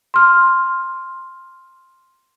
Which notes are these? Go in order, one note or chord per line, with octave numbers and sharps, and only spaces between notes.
C6 F6